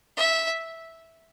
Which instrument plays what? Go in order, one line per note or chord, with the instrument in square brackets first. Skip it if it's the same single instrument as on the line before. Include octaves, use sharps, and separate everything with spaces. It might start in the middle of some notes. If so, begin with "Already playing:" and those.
[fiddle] E5